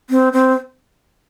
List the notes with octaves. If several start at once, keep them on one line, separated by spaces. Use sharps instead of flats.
C4
C4